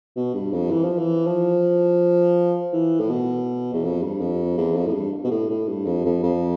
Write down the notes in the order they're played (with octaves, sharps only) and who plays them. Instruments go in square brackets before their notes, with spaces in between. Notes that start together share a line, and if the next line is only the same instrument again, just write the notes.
[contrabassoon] B2
G2
F2
E3
F3
E3
F3
E3
A2
B2
E2
F2
G2
F2
E2
F2
A2
G2
B2
A2
A2
G2
F2
F2
F2